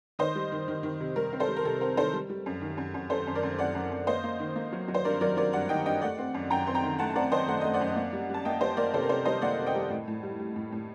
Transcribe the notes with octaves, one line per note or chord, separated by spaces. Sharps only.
D#3 C5 D#5
G3
D#3
D#3
D#3
C3
G3 A#4
C4
A4 C5
G3
A#4
C3 A4
C4 A#4
D#3 A4 C5
G3
G3
F#2
D#3
F#2
F#2
F#2 A4 C5
F#2
A#4 D5
F#2
F#2 D5 F#5
F#2
F#2
A#3 C5 D#5
A#3
D#3
A#3
F#3
F#3
C5
G2 A#4 D5
F#3 A#4 D5
F#3 A#4 D5
G2 D5 F#5
D#3 D#5 G5
G2 D#5 G5
A3 D5 F#5
C4
F#2
F#2 G5 A#5
C4 C6
G5 A#5
D#3
A3 F#5 A5
C4 D5 F#5
C4 C5 D#5
A3 F#5
A3 D#5
D5 F#5
F#2
A#3
G3
G3
A5
A#3 D#5 G5
G3 C5 D#5
A#3 A#4 D5
C3 A4 C5
A#4
C3 A4 C5
G3 C5 D#5
A#3 D5 F#5
C3
D#5 G5
G3
A2
A2
G3
G3
A2
A2